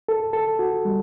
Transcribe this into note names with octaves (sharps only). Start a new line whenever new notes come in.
A4
A4
F#4
G3